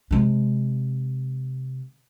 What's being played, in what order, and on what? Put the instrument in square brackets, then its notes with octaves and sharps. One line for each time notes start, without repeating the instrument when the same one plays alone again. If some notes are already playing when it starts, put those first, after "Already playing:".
[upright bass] C3 G#3